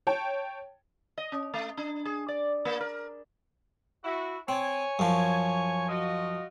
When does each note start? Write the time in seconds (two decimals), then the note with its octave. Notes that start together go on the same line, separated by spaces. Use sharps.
0.07 C#5 G5 A5
1.18 D#5
1.32 C#4
1.54 A3
1.77 D4
2.05 G#4
2.28 D5
2.65 A#3
2.80 A#4
4.04 E4 F#4
4.48 C4 C#5 G#5
4.99 F#2 F3
5.88 F4 F#4 D#5